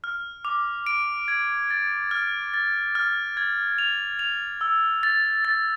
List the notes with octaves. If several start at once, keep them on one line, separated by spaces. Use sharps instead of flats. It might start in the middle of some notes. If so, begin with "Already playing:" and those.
F6
D6
D7
G#6
A6
F6
A6
F6
G#6
F7
F7
E6
A6
A6